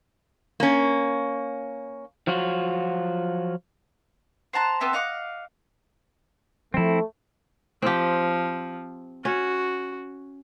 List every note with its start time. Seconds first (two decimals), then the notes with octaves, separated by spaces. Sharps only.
0.60 A#3 C#4
2.27 F3 F#3 F4 F#4
4.53 C5 F#5 A5 A#5
4.80 B3 C4 A4 E5
4.93 D#5 F5 F#5 D6
6.74 F3 F#3 A3 C4 E4
7.82 F3 C4 G4
9.25 C#4 F#4